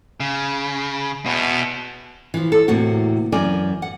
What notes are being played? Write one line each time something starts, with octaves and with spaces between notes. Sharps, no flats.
C#3
E2 B2
E3 F3
A4
E2 A2 C3 A#3 F#4
F#2 E3 A#4 D5 G#5
F#5